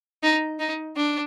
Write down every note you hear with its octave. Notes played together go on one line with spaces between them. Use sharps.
D#4
D#4
D4